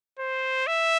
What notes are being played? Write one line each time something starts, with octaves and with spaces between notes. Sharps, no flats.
C5
E5